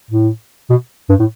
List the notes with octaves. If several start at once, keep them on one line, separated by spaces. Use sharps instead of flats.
A2
B2
G2
A2